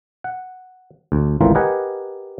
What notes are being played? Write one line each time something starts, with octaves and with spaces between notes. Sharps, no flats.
F#5
D2
G#1 C#2 A2 E3 F4 A#4
G4 A#4 B4 D#5 F#5 G#5